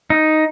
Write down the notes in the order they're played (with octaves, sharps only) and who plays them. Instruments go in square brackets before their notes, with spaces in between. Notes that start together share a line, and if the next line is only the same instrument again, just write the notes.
[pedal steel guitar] D#4